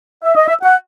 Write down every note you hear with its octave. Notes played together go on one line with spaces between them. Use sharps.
E5
D#5
E5
F#5